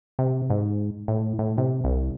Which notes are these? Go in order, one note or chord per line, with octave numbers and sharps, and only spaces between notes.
C3
G#2
A2
A2
C3
C2